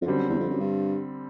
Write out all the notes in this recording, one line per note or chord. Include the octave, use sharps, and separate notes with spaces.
F2
F#2 D3 G3 C4
E2
F2
F#2
G2